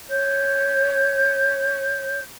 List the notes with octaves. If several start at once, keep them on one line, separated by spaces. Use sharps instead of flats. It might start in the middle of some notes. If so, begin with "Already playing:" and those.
C#5 G6